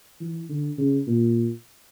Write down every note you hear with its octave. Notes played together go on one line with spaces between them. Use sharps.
E3
D3
C#3
A#2